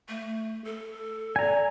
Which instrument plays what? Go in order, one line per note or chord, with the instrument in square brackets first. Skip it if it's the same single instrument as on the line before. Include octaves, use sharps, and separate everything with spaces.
[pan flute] A3
A4
[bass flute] D5 [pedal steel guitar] G#5 A#5